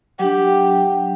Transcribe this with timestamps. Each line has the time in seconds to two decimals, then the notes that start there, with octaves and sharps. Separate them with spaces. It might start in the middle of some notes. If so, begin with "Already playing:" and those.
0.19 F#3 D4 G4